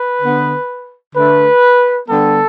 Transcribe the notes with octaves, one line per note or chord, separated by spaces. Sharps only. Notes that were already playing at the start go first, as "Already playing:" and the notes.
Already playing: B4
D3 B3
D3 A3 B4
D3 G3 B3 A4